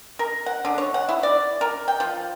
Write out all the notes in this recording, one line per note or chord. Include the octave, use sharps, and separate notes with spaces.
A#4
F#5
D3
C#5
F#5
E4
D5
A#4
G5
F3